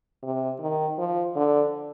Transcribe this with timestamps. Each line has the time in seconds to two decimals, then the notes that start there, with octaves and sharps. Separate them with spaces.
0.23 C3
0.60 D#3
0.98 F3
1.36 D3